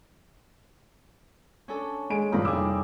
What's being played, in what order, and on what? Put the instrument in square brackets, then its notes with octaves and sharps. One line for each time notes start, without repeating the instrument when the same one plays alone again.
[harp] C#4 D4 A4
[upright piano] G#3 G#5 D7
[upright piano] G2 A#2 A#3 [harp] C4 D#4 E4
[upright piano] F1 D6 E6 [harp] G3 G#4